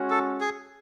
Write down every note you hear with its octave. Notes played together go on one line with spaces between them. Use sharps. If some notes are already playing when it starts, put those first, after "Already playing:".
Already playing: G#3 C#4 F#4
A4
G#4